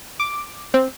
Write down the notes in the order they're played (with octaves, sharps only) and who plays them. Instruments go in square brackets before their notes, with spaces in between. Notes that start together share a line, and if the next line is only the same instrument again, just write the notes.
[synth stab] D6
C4